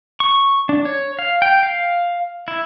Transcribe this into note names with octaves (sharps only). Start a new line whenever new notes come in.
C#6
D4
C#5
F5
G5
F5
E4